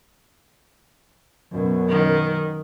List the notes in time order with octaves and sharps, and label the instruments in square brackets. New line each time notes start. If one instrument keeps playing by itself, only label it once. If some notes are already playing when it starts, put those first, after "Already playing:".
[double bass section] F#2 B2
[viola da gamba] D#3